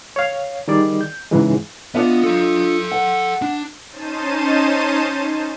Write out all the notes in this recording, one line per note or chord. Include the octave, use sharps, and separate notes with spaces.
C#5 F5
D#3 G3 G#4 D5
G6
G#2 C#3 E3 G#3
B3 D4 F4 D#5
A4 F5
F#5
D4
C#4 D#4 C5 A5 D#7